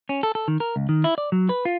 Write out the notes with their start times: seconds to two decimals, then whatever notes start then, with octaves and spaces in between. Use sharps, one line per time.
0.09 C#4
0.23 A4
0.35 A4
0.48 D#3
0.60 A#4
0.76 C#2
0.89 D#3
1.04 E4
1.18 D5
1.32 F#3
1.49 B4
1.65 F4